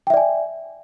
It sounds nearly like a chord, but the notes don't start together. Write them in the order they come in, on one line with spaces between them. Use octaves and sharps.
G5 E5 D5 G#5